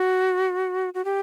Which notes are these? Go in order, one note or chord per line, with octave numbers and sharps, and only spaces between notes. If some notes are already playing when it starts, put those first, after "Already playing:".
Already playing: F#4
F#4
G4